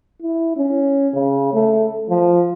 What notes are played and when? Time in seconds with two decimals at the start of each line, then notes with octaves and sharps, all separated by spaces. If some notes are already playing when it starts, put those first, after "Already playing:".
0.22 E4
0.57 C#4
1.14 C#3
1.54 A3
2.10 F3